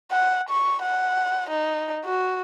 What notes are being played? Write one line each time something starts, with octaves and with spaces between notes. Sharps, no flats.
F#5
C#6
F#5
D#4
F#4